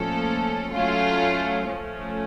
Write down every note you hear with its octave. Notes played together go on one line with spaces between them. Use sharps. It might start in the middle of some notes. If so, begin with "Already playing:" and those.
Already playing: A#2 F3 A3 C#4 A4
F#3 A3 C#4 F4
F3 A3 C#4